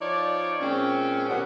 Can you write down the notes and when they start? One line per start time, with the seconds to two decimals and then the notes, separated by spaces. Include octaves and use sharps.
0.01 F3 D#4 C#5 D5
0.61 A#2 G#3 C4 C#4
1.28 B2 D#3 G3 B3 F#5